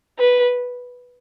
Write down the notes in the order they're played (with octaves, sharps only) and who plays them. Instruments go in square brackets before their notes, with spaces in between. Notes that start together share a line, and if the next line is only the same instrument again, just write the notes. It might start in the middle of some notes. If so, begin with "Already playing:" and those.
[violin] B4